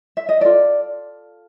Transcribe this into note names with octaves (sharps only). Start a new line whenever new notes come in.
E5
D#5
F4 A4 D5